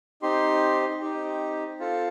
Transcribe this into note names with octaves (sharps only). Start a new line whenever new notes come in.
C4 D#4 G4 C6
C4 D#4 G4
C4 F4 A4